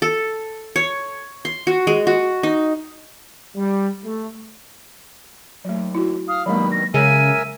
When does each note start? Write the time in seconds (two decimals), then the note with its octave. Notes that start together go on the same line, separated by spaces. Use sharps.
0.02 A4
0.76 C#5
1.45 C6
1.67 F#4
1.87 G#3
2.07 F#4
2.43 D#4
3.55 G3
4.03 A3
5.65 D#2 F#3 A3
5.95 E4 F#4
6.28 F5 D#6
6.46 G2 B2 D#3 F#3 G#3 A#3 B5
6.72 A#6
6.94 C#3 G#3 A#4 E5 G#5 D#7